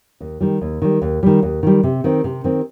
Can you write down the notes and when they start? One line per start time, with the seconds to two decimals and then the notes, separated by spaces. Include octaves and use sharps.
0.21 D#2
0.41 D#3 G3
0.61 D#2
0.82 D#3 G3
1.02 D#2
1.23 D#3 G3
1.43 D#2
1.63 D#3 G3
1.83 C3
2.04 D#3 C4
2.24 C3
2.44 D#3 C4